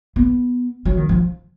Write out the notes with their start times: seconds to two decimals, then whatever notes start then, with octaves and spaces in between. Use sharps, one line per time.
0.16 B3
0.85 F#3
0.97 D#3
1.09 F3